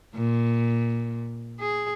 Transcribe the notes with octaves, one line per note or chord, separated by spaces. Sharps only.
A#2
G#4